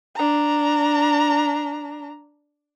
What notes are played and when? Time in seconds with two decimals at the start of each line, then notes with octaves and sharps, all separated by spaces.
0.15 D4 A#5